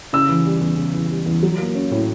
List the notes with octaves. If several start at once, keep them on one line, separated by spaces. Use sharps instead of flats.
C#3 E6
E3
G3
E2
C#3
E3
G3
E2
F#3
A#3
C#4
A2